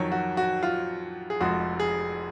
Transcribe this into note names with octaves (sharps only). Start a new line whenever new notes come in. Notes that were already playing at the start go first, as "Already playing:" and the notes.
Already playing: F2 D#3 F#3 C#5
F#4
F#4
F4
G#4
F1 F2 F3 G#3 F#4
G#4